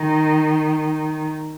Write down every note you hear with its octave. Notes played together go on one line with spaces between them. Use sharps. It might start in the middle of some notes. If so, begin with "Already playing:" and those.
Already playing: D#3